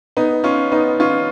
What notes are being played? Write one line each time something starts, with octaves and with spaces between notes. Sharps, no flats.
B3 D#4
C#4 F4
B3 D#4
C#4 F4